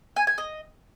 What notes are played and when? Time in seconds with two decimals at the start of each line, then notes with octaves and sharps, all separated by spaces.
0.16 G#5
0.27 G#5
0.38 D#5